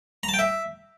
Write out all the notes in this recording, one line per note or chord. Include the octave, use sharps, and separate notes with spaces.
A#5
A5
G5
E5